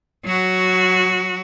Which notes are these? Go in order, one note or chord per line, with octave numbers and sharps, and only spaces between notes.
F#3 F#4